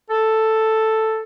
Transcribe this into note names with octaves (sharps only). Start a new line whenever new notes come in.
A4